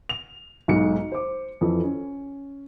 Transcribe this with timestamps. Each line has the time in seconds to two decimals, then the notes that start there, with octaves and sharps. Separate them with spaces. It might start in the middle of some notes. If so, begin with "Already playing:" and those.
0.09 F7
0.68 B1 G#2 F#3 C#7
1.12 C5 D6
1.61 F2 E3 A4
1.84 C#4